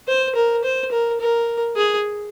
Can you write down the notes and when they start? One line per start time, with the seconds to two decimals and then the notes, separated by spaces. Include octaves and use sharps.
0.08 C5
0.35 A#4
0.64 C5
0.92 A#4
1.20 A#4
1.76 G#4